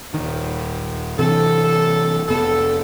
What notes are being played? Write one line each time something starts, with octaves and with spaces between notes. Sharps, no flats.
D#1 D#3
C3 E3 C4 A4
F1 B3 A4